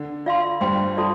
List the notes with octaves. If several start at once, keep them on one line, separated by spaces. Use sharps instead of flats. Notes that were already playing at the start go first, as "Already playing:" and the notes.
Already playing: D3
F4 D5 F5 C6
G2 G3 C5 G5 C6
F4 A4 D5 A5 C6